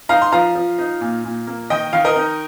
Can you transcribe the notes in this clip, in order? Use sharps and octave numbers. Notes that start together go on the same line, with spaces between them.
D#4 F5 A#5
C6
F3 F5 A#5
F3
D#4
A#2
A#2
A#3
D#3 D#5 G5
D#3 F5
A#4 D#5
D#4